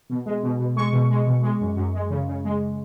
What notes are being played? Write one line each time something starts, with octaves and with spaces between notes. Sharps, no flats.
B2
G#3
B2
B2
G#3 C#6
B2
G#3
B2
G#3
F#2
F#2
G#3
C#3
C#3
G#3